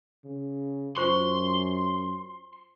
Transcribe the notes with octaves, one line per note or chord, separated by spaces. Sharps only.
C#3
F#2 F4 C5 C6 C#6